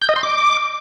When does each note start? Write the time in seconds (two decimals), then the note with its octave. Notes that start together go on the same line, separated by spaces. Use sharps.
0.02 G6
0.09 D#5
0.16 C6
0.23 D6